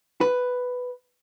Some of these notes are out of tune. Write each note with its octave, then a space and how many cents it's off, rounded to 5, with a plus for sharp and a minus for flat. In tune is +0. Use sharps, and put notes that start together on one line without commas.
B4 +5